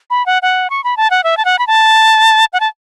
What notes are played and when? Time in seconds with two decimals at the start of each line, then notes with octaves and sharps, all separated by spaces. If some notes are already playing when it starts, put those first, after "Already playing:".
0.10 B5
0.26 F#5
0.42 F#5
0.70 C#6
0.84 B5
0.97 A5
1.10 F#5
1.24 E5
1.37 A5
1.45 F#5
1.59 B5
1.67 A5
2.53 F#5
2.60 A5